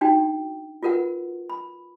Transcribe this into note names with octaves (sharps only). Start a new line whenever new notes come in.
D4 D#4 F#4 G5
F4 F#4 A#4 B4 F#5
B5